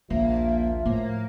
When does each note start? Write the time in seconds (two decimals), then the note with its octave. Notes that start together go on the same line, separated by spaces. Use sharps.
0.10 A#1 D#2 F3 A#3 E5
0.85 A2 A#3